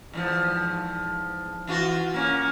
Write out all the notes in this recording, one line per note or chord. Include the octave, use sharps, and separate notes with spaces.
E2 G#2 F3
E3 F4 F#4
A#3 C#4